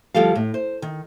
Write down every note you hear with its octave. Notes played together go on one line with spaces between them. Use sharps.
D2 F3 G3 G4 A4 F5
A2
C5
D#3